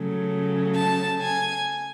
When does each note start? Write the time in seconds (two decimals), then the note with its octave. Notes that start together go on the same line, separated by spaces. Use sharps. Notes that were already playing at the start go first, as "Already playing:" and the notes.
Already playing: C#3 F#3 A3
0.75 A5
1.22 G#5